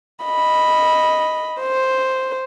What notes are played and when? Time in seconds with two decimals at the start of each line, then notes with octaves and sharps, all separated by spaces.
0.24 D#5 B5
1.61 C5